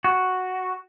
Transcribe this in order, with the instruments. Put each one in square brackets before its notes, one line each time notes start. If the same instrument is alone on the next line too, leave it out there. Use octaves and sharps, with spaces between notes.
[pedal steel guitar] F#4